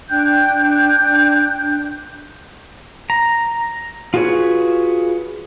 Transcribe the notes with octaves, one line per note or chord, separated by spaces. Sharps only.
D4 G5 F#6 G6
A#5
F4 F#4 G#4 B4 C#5